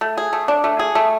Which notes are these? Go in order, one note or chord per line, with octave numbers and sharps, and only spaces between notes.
A3
G#4
A3
D4
A3
G#4
A3